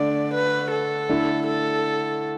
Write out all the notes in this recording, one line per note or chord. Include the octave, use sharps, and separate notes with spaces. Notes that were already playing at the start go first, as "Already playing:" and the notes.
Already playing: D3 A3 D4 D5
B4
A4
D3 A3 E4
A4